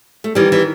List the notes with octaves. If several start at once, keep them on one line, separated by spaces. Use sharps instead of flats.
A3
D#3 E3 G3
E3